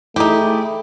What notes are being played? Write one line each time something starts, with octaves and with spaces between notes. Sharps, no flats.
A3 D#4 E4 G4 G#4